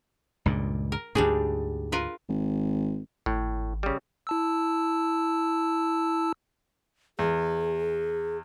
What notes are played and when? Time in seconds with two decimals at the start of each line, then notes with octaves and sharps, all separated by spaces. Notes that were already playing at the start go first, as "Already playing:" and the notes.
0.46 C#2 G2 A#2
0.92 A#4
1.15 D2 G#2 G3 D4 G#4
1.92 F4 A#4 B4
2.29 G#1
3.26 G#1 A2
3.83 C#3 G3
4.27 E4 A5 E6
7.19 E2 G#4